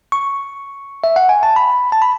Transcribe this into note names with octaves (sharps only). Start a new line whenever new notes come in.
C#6
E5
F#5
G#5
A5
B5
A5
B5